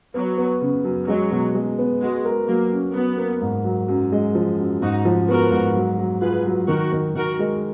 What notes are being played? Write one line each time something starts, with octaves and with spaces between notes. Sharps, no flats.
F#3 B3
B3
C#3
F#2
F#3 G#3
B2
G#3
B3
G#3 F#4
A#4
F#3 A#3
C#4
F#3 B3
A#3
G#2
F#3
F#2
G#3
F3
F#2
G#2 D#4 F#4
F3
B3 F#4 A#4
G#2
F#3
F#3
F4 G#4 B4
F#3
D#3 F#4 A#4
D#3
D#3 F#4 A#4
G#3